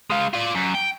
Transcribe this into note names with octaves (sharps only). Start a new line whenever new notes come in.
G#3 F5
F4 D5
F#2
G5